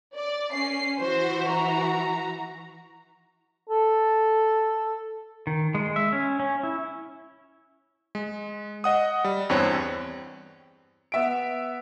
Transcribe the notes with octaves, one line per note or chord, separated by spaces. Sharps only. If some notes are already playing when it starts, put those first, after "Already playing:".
D5
C#4 C7
E3 F#4 C5
A#5
A4
D#3
G#3
E5
C#4
C#4
E4
G#3
D#5 F#5 D#6
G3
E2 G2 C4 C#5 F#6
B3 E5 D7